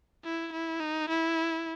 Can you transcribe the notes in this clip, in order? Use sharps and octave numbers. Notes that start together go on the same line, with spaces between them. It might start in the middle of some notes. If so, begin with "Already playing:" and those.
E4
E4
D#4
E4